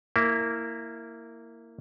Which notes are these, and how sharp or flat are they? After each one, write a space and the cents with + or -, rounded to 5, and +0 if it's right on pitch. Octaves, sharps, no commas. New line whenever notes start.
A#3 -15 E4 +0